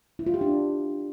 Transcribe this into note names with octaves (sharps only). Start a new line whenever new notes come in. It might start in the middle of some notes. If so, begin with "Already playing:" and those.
E4
F4
G4
D4